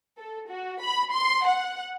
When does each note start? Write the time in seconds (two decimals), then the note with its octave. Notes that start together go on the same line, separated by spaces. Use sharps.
0.18 A4
0.50 F#4
0.81 B5
1.13 C6
1.46 F#5